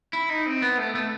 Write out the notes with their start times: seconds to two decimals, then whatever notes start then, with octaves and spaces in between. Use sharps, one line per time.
0.13 E4
0.29 D#4
0.46 C4
0.62 B3
0.78 A3
0.95 A3